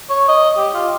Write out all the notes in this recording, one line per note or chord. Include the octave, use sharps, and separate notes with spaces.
C#5
D#5
G4
F4